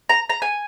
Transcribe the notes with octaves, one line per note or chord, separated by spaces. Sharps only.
A#5
A#5
G#5